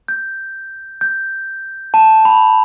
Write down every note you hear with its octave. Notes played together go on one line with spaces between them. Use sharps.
G6
G6
A5
B5